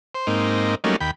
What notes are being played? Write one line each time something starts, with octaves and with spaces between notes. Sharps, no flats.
C5
G#2 A#3 C4 D#4
F#3 G3 A3 A#3 C#4 D#4
D#2 G5 B5